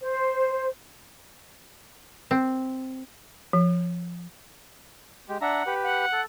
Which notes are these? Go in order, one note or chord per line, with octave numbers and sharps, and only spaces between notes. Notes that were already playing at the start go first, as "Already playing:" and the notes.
C5
C4
F3
G#3 G4
D4 E5 F#5 A#5
G4 B4
F#5
A4